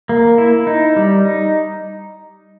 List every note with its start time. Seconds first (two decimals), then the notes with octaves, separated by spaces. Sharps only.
0.09 A#3
0.38 E4
0.67 D#4
0.97 G3
1.25 D#4